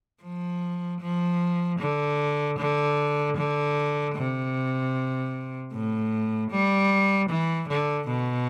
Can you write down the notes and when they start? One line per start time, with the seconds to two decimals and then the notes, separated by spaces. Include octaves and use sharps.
0.23 F3
1.01 F3
1.80 D3
2.58 D3
3.37 D3
4.16 C3
5.73 A2
6.51 G3
7.30 E3
7.68 D3
8.08 B2